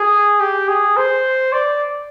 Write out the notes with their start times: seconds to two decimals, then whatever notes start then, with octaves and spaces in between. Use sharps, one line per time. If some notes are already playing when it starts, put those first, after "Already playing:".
Already playing: G#4
0.41 G4
0.68 G#4
0.97 C5
1.53 D5